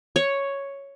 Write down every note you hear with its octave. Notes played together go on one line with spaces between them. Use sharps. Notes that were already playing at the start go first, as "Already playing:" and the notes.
C#5